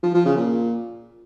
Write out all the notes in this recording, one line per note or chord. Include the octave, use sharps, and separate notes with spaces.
F3
F3
C#3
A#2